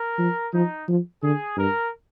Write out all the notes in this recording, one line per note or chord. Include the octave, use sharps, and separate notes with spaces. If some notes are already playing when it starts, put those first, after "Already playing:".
Already playing: A#4
F3
F3 D#4
F3
D3 G#4
G2 A#4